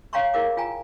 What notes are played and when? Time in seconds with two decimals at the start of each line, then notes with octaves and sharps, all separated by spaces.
0.13 C#5 F5 G5 A#5 C6 C#6
0.34 E4 G#4 A#4 F5 D6
0.57 F4 G5 G#5 A#5